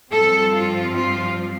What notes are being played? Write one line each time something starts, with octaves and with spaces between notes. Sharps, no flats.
G2 F3 C4 A4
F4
F4